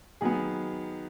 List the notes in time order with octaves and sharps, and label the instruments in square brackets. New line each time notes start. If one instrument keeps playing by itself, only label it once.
[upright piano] D#3 F#3 B3 G#4